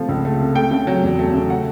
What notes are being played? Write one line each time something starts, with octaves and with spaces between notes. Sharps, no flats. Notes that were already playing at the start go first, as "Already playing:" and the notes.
Already playing: C3 F3 A3
C#2
A3
C3
A3 G5
C#3
F#3
E2
A3
C#3
A3 F#5